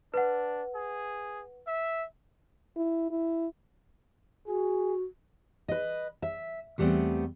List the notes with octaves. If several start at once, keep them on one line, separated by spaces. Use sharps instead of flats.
D4 B4 F#5
G#4
E5
E4
E4
F#4 G#4
B4 D#5
E5
E2 G3 A3 B3 C4